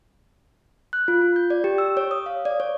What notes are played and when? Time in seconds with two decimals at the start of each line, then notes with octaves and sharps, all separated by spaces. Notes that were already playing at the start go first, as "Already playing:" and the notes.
0.93 F#6
1.08 F4
1.21 F4
1.36 G6
1.50 D5
1.64 G4
1.78 E6
1.97 C#5
2.11 D#6
2.26 F5
2.45 D5
2.60 C#5